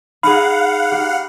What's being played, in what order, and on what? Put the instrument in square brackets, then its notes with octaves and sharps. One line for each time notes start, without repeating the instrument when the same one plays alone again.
[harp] D#4 G#4 [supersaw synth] F5 F#5 [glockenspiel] B5
[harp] D#4 G4